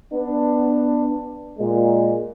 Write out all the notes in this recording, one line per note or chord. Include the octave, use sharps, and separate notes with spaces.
B3 D4
A#2 G#3